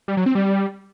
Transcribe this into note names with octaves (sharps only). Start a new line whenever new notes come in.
G3
F#3
C4
G3